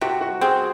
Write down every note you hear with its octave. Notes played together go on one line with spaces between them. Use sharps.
C3 F#4
F#4
C4 G#4